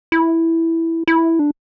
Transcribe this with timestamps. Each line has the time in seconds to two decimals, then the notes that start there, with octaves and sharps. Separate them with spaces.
0.12 E4
1.08 E4
1.39 D4